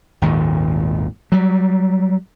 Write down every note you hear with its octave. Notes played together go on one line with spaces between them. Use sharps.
G#1 D#2 A#2
F#3 G3